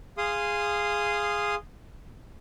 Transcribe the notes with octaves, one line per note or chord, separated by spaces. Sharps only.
G#4 F5 C6 D#6